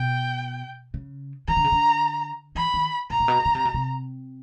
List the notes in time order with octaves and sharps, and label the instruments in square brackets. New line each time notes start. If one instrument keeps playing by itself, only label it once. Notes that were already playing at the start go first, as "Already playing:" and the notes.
Already playing: [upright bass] B2 [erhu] G5
[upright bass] C#3
[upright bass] D#3 [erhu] A#5
[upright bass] D3
C#3
D3
[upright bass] E3 [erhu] B5
[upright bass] D#3
[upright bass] A#2 [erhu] A#5
[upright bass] A#2
B2
C#3
C3
B2
C3